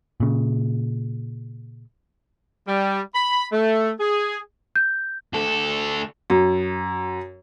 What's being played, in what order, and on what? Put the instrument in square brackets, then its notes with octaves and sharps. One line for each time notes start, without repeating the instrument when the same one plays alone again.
[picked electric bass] A#2 C#3
[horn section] G3
B5
A3
G#4
[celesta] G6
[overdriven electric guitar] D2 A4
[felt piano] F#2